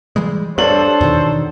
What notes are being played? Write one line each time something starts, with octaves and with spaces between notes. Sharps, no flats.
E3 G3 G#3
G2 D4 A4 C5 C#5 F#7
E2 B2 D#3